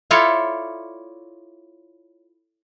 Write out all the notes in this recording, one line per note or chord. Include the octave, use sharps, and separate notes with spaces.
E4 F4 A4 C#5 D5 E5